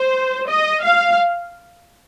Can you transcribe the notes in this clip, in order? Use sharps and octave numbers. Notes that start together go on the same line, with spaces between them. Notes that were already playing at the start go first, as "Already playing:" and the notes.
Already playing: C5
D#5
F5